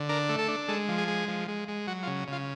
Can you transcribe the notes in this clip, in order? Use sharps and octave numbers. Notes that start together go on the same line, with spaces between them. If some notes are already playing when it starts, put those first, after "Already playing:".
Already playing: D3
D4 A#4
A3
A4
D4
G#3 A4
F3
G#4
G#3
F3
G#3
G#3
F#3 F#4
F4
C#3
C#3 F4